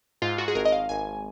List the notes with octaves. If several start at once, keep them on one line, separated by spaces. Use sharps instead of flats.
G#2 F4
F#4
G#4
G#1 A#4
D#5
F5
G#1 G#5